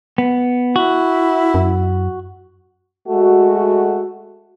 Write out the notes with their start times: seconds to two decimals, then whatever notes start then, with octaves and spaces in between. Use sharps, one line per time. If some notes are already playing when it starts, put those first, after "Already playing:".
0.18 B3
0.76 E4 F#4
1.54 F#2
3.08 G#3 A3 F#4